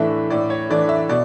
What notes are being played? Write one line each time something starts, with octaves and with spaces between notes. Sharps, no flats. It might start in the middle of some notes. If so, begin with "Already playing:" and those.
Already playing: A2 E3 A3 D4 E5
A2 D5
C#5
E3 A3 D4 D5
E5
B2 D5